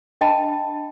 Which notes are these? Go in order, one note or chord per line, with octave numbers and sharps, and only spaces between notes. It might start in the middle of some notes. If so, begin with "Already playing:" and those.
D4 D#5 G5 A5 B5